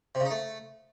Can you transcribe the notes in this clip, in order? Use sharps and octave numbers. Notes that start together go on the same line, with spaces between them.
C3
C#3
D#4
A3